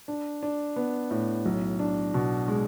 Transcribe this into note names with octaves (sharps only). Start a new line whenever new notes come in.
D4
D4
B3
A2
B1
D4
B2
G#3